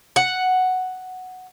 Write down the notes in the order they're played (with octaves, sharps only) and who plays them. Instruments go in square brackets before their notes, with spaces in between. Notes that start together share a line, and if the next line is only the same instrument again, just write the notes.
[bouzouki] F#5